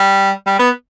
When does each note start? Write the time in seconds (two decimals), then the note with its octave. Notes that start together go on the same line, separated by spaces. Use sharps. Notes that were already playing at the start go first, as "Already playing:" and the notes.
Already playing: G3
0.46 G3
0.60 B3